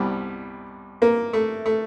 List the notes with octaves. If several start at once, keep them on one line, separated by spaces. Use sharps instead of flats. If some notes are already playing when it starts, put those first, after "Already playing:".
Already playing: C2 B2 G3
A#3
A3
A3